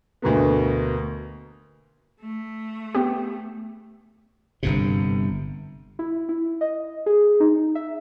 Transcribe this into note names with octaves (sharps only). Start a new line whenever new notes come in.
D2 B2 A#3 B3
A3
B3 G4
G1 G2 C3
E4
E4
D#5
G#4
D#4
E5